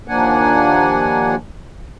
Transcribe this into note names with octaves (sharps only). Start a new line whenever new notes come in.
D#2 F3 A#3 D4 F#5 G#5